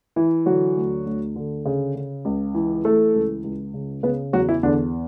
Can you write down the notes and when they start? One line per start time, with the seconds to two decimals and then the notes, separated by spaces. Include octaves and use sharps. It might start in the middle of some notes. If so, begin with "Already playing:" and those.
0.16 E3 E4
0.46 D3 F#3 F#4
0.76 D2
1.06 D2
1.36 D3
1.65 C#3
1.95 C#3
2.25 C#2
2.54 E3
2.84 E3 A3 A4
3.14 C#2
3.44 C#2
3.74 C#3
4.03 C#3 B3 B4
4.33 E2 F#3 F#4
4.49 E3 E4
4.63 E2 D3 D4